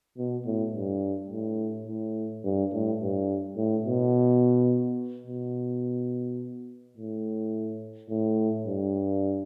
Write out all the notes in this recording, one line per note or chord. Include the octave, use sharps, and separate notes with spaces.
B2
A2
G2
A2
A2
G2
A2
G2
A2
B2
B2
A2
A2
G2